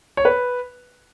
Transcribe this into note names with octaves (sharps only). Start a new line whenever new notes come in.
C#5
B4